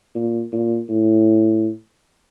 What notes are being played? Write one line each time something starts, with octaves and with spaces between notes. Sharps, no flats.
A#2
A#2
A2